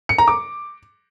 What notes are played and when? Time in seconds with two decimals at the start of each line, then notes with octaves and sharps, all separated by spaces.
0.09 C#7
0.18 A#5
0.28 D6